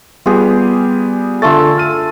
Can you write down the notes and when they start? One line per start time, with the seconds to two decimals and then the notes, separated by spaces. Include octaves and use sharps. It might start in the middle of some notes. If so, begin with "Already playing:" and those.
0.26 G3 B3 F4 G4 G#4
1.42 D3 A3 F4 A5 E6 A6
1.78 F6 D#7